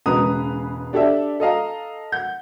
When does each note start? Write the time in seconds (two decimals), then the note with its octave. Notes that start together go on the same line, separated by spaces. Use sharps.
0.06 E1 C#3 G#3 B4 A#5 D#6
0.93 D4 G4 A4 D5 E5
1.40 A4 D#5 F5 A#5
2.12 F#5 G6